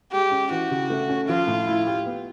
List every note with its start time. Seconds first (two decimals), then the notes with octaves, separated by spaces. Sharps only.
0.12 G#3 G4
0.31 C#4
0.51 E3 F#4
0.71 C#3
0.90 A3
1.09 C#4
1.28 F3 F4
1.48 A2
1.68 E4
1.87 G4
2.06 B3